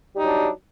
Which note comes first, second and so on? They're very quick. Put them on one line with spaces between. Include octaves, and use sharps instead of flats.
G3 D#4 F#3 D4